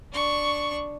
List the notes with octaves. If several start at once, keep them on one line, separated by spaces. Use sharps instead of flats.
D4 C#6